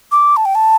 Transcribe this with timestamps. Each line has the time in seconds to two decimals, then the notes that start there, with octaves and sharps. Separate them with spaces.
0.12 D6
0.37 A5
0.45 G5
0.55 A5